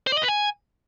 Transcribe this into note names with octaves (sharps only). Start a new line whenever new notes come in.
C5
D5
D#5
B4
G#5